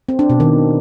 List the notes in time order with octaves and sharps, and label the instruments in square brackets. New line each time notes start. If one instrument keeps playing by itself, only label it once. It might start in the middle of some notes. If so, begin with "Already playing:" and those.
[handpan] C4
D4
B2
D#3